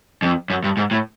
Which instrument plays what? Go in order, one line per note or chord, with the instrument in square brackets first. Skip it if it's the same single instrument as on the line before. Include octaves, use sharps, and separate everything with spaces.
[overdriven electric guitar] F2
F#2
G2
G#2
A2